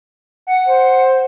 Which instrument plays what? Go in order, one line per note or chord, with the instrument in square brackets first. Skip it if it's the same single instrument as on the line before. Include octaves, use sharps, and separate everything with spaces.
[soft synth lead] F#5
[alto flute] C5